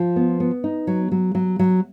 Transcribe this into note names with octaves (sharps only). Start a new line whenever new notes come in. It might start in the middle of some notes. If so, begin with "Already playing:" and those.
Already playing: F3 F4
B3
B3
D#4
F#3
F#3
F#3
F#3